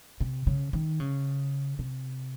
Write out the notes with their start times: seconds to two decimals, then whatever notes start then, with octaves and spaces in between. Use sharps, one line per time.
0.20 C3
0.47 C#3
0.73 D#3
1.00 C#3
1.79 C3